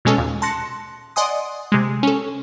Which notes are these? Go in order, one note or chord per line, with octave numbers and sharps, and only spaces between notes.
B2 G#3 C#4 A4
D#2 A#2
A5 C6 F#6 A#6 C#7
D5 D#5 F#5 G#5 C6 D#6
C3 G#3
C#4 A4